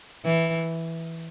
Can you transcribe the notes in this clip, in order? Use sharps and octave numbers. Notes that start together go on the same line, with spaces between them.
E3